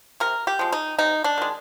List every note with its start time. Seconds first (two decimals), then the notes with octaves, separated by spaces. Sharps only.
0.20 C3 A#4
0.47 G4
0.59 F3 G#3
0.72 D#4
0.98 C3 D#4
1.24 D4
1.38 D#3 G#3